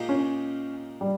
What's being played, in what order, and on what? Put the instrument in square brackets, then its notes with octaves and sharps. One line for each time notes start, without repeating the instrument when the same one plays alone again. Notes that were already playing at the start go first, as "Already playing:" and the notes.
Already playing: [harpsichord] A#2 G#3 D#4 G4
[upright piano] C#4
G3